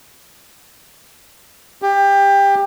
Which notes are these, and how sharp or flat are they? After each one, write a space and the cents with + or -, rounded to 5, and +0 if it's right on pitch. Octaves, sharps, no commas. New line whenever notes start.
G4 +20